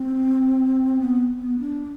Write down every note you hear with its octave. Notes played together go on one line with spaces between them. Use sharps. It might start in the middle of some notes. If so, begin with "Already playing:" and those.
Already playing: C4
B3
B3
D4